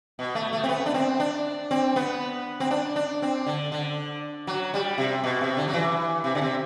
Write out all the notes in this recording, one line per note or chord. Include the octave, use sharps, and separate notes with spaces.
B2
A3
A3
C4
B3
D4
C4
D4
C4
B3
C4
D4
D4
C4
D3
D3
F#3
G3
C3
B2
C3
D3
F#3
E3
C3
D3
C3